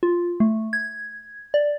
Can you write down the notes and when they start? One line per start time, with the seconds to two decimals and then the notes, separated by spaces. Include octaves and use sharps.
0.03 F4
0.40 A3
0.73 G#6
1.54 D5